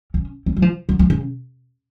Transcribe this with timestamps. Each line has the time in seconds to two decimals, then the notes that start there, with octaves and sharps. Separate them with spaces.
0.14 C#4
0.46 C4
0.57 F#3
0.62 F3
0.89 F#3
0.99 F3
1.10 C#3